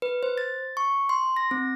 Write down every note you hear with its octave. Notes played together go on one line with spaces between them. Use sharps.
B4
C5
A6
C#6
C6
A#6
C4